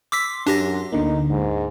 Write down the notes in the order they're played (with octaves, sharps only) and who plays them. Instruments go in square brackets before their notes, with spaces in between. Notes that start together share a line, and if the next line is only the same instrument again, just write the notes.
[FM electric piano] C6 [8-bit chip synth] D6 E6 B6
[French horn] F#2 [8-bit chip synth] D4 G4 A#6
[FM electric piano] D2 D3 A#3 [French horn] D#4
[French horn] G#2